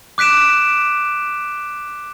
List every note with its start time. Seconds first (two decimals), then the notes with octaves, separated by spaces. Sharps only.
0.18 D6 F#6 B6 D7 E7